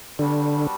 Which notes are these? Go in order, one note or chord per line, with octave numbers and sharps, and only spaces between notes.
D3 G3 B3 D4 F#4